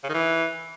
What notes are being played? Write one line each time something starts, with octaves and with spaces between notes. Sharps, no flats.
C#3
D#3
E3